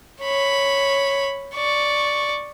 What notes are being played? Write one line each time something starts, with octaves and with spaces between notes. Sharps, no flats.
C#5 B5
D5 C#6